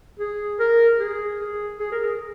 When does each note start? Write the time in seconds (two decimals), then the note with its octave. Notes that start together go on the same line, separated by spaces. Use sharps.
0.19 G#4
0.60 A#4
0.99 G#4
1.40 G#4
1.79 G#4
1.92 A#4
2.05 G#4